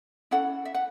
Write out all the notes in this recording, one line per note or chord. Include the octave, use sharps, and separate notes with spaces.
C#4 E4 A4 F#5
E5
F#5